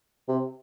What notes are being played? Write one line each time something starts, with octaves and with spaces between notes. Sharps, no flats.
C3